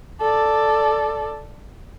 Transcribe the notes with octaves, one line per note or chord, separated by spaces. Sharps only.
A4 D5